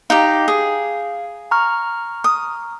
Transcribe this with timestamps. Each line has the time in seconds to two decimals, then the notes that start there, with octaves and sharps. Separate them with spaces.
0.10 D#4 G4 F5
0.48 G#4
1.51 A#5 C#6 F6
2.24 D#6